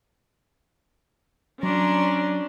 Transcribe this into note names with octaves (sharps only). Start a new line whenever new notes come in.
F#3 C#4 D4 D5 A#5 C6